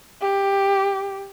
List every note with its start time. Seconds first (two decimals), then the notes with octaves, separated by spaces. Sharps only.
0.21 G4